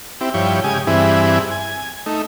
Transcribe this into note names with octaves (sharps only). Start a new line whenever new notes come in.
C4 E4 G4
G2 F3 E4 C#5 G5
C#3 G#3 G4 G#5 D#6
G2 E3 C4 E4 G#4
G#5
A3 D#4